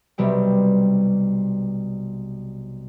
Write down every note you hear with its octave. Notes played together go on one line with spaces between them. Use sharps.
B1 C3 G3 G5